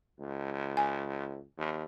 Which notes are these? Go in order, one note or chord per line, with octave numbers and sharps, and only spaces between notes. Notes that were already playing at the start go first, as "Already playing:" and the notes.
C#2
G#5
D#2